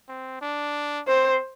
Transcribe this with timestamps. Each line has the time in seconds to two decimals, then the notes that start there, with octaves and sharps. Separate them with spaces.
0.09 C4
0.41 D4
1.08 C4 C5